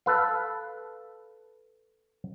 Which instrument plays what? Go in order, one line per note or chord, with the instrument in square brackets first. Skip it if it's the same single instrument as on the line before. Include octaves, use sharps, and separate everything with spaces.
[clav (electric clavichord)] A4 B4 F5